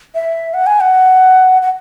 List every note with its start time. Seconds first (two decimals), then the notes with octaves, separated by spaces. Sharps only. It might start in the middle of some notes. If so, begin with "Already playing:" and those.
0.15 E5
0.54 F#5
0.67 G#5
0.80 F#5
1.62 F#5